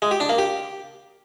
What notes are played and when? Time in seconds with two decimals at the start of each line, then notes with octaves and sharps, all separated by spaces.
0.02 G#3
0.11 G4
0.20 D4
0.29 A#3
0.38 G4